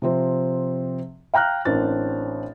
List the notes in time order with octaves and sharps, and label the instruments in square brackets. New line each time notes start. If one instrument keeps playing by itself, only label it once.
[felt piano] C3 F3 C4
F5 G5 A#5 F6 F#6
A1 C4 D4 A#4 A6